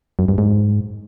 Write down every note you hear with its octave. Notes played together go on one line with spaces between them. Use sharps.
F#2
G2
G#2